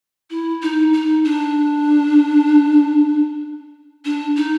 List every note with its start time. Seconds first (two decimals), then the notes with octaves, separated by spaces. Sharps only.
0.30 E4
0.62 D#4
0.93 D#4
1.25 D4
4.05 D4
4.36 D#4